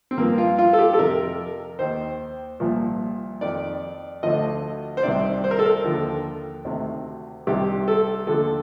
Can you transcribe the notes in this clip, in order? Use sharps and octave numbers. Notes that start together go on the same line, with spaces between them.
C4
G2 F3 A#3
F4
F4
A4
G4
A4
F2 C3 F3 A#4
D#2 D#3 C5
C2 A#2 F3
F2 D#3 D5
D2 D3 F3 D#5
C5
C2 C3 D#3 D5
C5
A#4
A4
A#4
D#2 D3 F3
D2 C3 D#3
C2 C3 D#3 G4
A4
D#2 D3 F3 A4